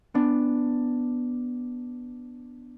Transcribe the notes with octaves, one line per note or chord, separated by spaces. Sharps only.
B3 D4